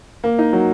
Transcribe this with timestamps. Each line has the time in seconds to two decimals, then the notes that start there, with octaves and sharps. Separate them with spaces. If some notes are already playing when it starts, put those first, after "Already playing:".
0.24 A#3
0.39 D#4
0.53 F#3